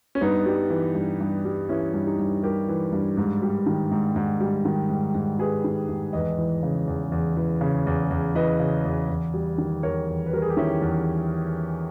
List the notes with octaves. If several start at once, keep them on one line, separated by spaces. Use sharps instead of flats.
C#4
G2 B3 D#4
G3
E3
G2
G2
G3
E3 C#4 E4
G2
D#4 G4
G2
G3 G4 A#4
E3
G2
G#2
G3
D#3
G#2
G#2
G3
D#3
G#2
G#2
G3 G#4 B4
D#3
G#2
E2 B4 D#5
E3
C#3
E2
E2
E3
C#3
E2
E2
E3 B4 D#5
C#3
E2
E2
G3
D#3
E2 A#4 C#5
E2
B4
G3 A#4
G#4
G4
D#3 C#4 E4
E2